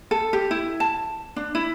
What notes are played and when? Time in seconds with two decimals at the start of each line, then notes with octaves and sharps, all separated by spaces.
0.11 A4
0.33 G4
0.51 E4
0.80 A5
1.36 D4
1.55 E4